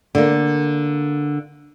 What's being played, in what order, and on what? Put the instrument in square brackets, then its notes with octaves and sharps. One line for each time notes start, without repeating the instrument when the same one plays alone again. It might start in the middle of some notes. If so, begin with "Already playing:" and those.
[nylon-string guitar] D3 A#3